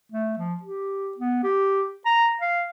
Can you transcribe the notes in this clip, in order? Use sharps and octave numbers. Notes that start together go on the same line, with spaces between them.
A3
F3
G4
B3
G4
A#5
F5